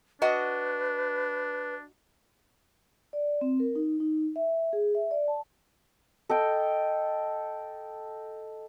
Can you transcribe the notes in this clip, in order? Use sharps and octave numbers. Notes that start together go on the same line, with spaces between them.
D4 F#4 B4 D#5 F#5
D5
C4
A#4
D#4
D#4
E5
G#4
E5
D5
A5
A4 D#5 G5